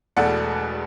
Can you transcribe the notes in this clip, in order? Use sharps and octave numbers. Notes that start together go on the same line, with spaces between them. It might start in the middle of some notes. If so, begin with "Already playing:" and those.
E1 E2 B2 A3 D5 F#5